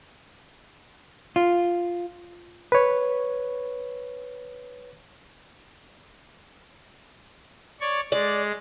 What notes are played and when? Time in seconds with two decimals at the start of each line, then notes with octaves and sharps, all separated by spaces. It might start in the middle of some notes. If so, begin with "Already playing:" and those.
1.36 F4
2.72 B4 C#5
7.80 C#5 D5 C#6
8.12 G#3 D5